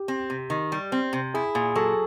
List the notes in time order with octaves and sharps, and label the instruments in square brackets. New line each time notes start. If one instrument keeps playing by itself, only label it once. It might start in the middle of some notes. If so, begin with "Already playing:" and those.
Already playing: [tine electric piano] G4
[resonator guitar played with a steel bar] C4
C3
D#3
G3
C4
C3
[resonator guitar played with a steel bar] E4 [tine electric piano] G#4
[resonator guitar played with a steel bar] A#2 [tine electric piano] G#4
[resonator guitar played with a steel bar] F#3 [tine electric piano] A4